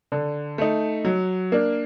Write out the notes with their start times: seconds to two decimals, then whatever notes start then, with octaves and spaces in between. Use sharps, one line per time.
0.12 D3
0.58 A3 D#4
1.05 F#3
1.52 A#3 D4